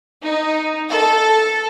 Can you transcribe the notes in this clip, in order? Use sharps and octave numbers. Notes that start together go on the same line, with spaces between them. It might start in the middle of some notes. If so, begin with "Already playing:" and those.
D#4
A4